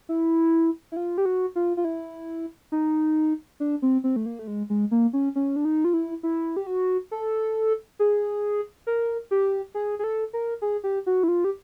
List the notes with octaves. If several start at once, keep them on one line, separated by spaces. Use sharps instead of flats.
E4
E4
F4
G4
F#4
F4
F4
E4
D#4
D4
C4
C4
A3
A#3
A3
G#3
G#3
A#3
C#4
C#4
D4
D#4
F4
E4
E4
G4
F#4
A4
G#4
A#4
G4
G#4
G#4
A4
A#4
G#4
G4
F#4
E4
F4
G4